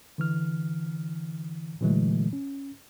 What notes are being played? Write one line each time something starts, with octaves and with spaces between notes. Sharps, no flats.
D3 E3 F6
A#2 D3 E3 F#3 G#3 A3
C#4